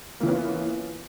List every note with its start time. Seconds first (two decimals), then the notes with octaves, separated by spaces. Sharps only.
0.20 A#3
0.23 E3
0.26 C#4
0.29 B3
0.31 F4